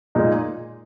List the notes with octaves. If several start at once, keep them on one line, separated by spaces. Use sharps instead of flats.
A#2 G#3 D#4